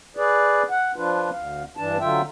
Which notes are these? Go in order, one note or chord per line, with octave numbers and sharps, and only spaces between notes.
G#4 B4 D5
F#5
F3 D4 F4 B4
D2 F5
G2 E3 D4 A5
D3 F#3 F4 E5 G5